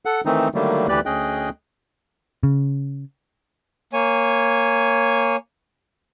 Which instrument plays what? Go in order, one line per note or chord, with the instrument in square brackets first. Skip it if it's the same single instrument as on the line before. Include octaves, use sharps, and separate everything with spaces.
[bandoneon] A4 F#5
D#3 E3 A3 C4 D#4
D3 D#3 F#3 G3 A3 A#3
D2 E3 G4 B4 D5 F#6
D2 C#4 G#4 D#5 G5 F#6
[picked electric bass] C#3
[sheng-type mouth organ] A#3 C#5 G#5